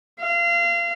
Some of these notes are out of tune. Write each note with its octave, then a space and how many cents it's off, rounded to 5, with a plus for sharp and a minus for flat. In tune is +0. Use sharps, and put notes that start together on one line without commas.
F5 -30